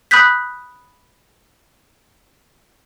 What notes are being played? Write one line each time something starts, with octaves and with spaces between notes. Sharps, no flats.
B5 D#6 F#6 G6 B6